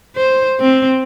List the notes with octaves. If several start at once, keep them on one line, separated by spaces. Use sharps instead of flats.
C5
C4